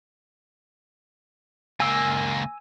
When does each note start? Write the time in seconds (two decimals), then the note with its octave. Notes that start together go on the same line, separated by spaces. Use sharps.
1.80 C#2 A#3 G#5 E6